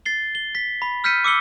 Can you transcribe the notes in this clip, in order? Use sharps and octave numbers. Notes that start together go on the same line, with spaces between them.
A6 C7 G7
G7
B6
B5
E6 F6 G6 B6 C#7 D#7
D6 E6 C#7 G7